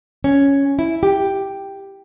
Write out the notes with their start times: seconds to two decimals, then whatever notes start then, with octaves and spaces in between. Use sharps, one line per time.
0.24 C#4
0.79 E4
1.03 G4